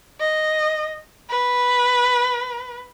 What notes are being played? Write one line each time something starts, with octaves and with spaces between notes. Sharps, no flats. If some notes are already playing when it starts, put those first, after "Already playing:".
D#5
B4